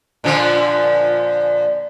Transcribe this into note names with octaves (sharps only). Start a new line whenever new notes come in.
A#2 D3 F3